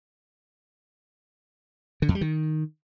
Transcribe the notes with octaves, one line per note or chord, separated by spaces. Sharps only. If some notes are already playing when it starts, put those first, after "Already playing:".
D3
F2
G3
D#3